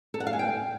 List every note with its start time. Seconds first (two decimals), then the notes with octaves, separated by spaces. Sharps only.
0.14 A4
0.20 F#5
0.27 F5
0.33 G#5
0.39 G5